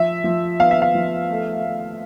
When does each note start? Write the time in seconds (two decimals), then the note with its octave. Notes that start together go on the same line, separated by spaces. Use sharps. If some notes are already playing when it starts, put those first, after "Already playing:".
Already playing: F3 E5
0.24 F3
0.60 B3 F5
0.71 E5
0.82 F5
0.95 F3
1.29 A3
1.64 A3